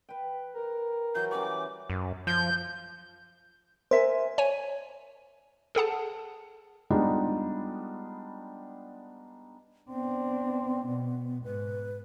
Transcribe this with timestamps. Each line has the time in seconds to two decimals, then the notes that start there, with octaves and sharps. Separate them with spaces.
0.09 B4 G5
0.54 A#4
1.15 E3 F#3 G6
1.31 G3 C#4 D6
1.90 F#2
2.27 F3 G6
3.91 A#4 C5 E5 G#5
4.38 C#5 G#5 D#7
5.75 G#4 A4 F#5 A5
6.90 G3 G#3 B3 D4 D#4 F4
9.90 B3 C4 D4
10.87 B2
11.44 G#2 B4